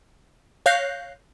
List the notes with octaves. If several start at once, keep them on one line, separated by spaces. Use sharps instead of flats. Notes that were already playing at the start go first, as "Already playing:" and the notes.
C#5 F5 F#6 G6 A#6 C7